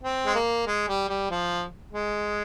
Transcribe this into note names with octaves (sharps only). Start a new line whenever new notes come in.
C4
G#3
A#3
G#3
G3
G3
F3
G#3